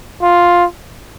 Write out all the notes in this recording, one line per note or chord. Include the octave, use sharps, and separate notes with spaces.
F4